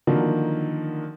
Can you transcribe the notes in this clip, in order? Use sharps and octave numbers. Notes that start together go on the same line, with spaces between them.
D3 D#3 F3 F#3 A#3